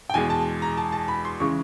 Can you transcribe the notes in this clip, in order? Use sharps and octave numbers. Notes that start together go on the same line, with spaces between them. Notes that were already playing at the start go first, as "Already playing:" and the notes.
G5
E2 B2 G#3 G#5
A5
A#5
A5
A5
B5
C6
C#3 E3 G#3 C#6